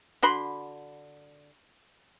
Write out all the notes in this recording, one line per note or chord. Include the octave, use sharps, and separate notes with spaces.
D3 F#4 B5 C6